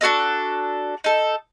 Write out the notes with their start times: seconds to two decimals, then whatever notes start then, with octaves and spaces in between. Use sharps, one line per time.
0.01 D4 F#4 A4 D#5
1.04 D#4 A4